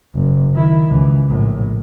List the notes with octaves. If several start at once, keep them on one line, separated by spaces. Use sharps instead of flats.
F#1
D#3 E4
C#2 E3
A#1 A2